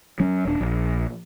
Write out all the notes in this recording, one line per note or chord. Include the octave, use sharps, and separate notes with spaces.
F#3 C#4
D#1 D4
A#1